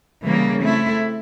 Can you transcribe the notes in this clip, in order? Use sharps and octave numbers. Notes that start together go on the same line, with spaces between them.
C#3 E3 G3 A#3
A3 C4 E4